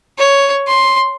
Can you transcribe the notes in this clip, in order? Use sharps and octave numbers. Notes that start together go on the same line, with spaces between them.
C#5
C6